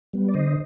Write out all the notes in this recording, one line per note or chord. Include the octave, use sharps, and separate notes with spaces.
G3 B3
D5
D3 C5 D#5